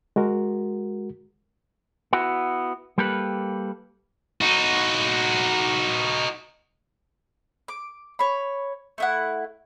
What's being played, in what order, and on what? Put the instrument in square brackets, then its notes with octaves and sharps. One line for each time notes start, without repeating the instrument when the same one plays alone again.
[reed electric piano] G#3 F#4 A#4
[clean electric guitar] B3 E4 F#4
G3 A#3 G4 A4 B4
[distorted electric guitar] D#4 F#4
[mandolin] D6
C#5 B5
A3 E4 F#5